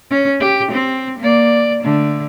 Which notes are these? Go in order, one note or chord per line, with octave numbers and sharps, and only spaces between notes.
C#4
G4
C4
A#3 D5
D3 A3